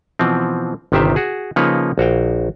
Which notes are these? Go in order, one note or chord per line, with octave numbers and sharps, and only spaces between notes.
B2 E3 F3 C4
G1 C3 D#3 G4 C5 E5
F#4 G#4
C#3 F3 A#3 D#4 B4 C#5
A#1 F#4 F5 G5